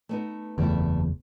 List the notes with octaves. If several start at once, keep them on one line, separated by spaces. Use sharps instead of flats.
A3 B3 D#4
F#1 E2 G3 A3 E4